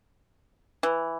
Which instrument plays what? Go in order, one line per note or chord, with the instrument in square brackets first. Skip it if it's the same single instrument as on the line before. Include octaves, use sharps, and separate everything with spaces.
[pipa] E3